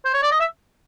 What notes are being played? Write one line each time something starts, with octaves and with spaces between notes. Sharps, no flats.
C5
C#5
D5
D#5
E5